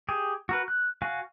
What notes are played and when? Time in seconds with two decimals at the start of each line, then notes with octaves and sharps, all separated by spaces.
0.09 G4 G#4
0.49 F#4 A#4 B4
0.68 F#6
1.02 F#4 F5 G#5